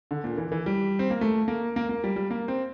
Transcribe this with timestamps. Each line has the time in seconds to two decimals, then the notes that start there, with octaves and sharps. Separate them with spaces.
0.11 D3
0.24 A#2
0.38 E3
0.52 E3
0.66 G3
0.99 C4
1.10 A#3
1.21 A3
1.48 A#3
1.76 A#3
1.89 A#3
2.04 G3
2.16 G3
2.30 A#3
2.48 C4